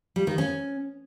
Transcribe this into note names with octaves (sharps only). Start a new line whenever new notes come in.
G3
D#3
C#4